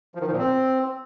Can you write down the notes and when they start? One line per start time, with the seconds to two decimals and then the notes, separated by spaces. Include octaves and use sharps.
0.15 F3
0.21 D#3
0.27 F3
0.33 A#2
0.38 C4